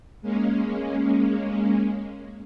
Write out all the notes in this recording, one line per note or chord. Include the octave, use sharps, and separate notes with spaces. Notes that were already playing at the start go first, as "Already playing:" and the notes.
G#3 A#3 C#4